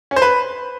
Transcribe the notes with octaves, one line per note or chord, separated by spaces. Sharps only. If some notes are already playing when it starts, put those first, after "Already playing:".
C#4
C5
B4